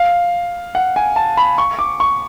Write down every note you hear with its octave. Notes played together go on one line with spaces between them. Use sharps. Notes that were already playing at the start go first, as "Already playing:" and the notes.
Already playing: F5
F#5
G#5
A5
B5
C#6
D6
C#6